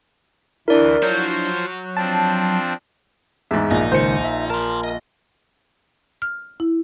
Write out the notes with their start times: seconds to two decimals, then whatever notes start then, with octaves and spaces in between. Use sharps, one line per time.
0.68 D2 E3 D4 E4 A#4 D5
1.03 F3 F#3 F4 C5 C#5 G6
1.97 F3 C4 D4 A5
3.51 E2 G#2 G#3 E5 A6
3.71 A#1 D#4
3.92 C#2 D#3 C5 C#7
4.25 E5
4.50 A#4 A5 C6
4.84 D#5
6.22 F6
6.60 E4